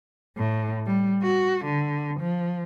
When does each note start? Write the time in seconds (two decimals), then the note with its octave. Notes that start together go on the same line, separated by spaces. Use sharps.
0.37 A2
0.86 G3
1.22 F#4
1.64 D3
2.20 F3